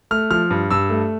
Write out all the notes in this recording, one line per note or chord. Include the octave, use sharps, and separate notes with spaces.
A3 F6
F3 F6
G2
G2 E6
A3